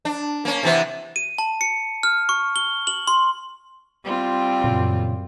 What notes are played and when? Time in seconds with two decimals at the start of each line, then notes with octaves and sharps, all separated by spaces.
0.05 D4
0.45 A#3 C#4
0.63 C3 E3 B3
1.16 D#7
1.38 A5
1.61 C#7
2.03 F6
2.29 C#6
2.56 G7
2.87 F#7
3.08 C6
4.04 G3 C4 F4
4.64 F#2 A#2 C#3